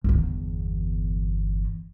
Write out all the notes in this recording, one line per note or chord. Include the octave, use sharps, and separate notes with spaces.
G1 E2